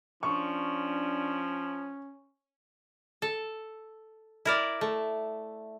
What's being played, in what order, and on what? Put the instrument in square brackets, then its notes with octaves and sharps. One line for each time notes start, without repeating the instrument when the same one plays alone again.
[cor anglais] F3 [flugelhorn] C#4 [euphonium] D4 [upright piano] C#6
[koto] A4
E4 A#4 D5
A3